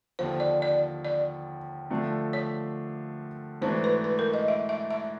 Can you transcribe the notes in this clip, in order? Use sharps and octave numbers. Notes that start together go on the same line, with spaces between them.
D#2 D3 F3 C5
D5
D5
D5
D3 F3 A3 D4
C#5
G#2 E3 A3 D4 F#4 C5
B4
B4
A#4
D#5
E5
E5
E5